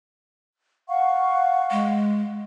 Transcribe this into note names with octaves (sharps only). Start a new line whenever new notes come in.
F5 F#5 C#6
G#3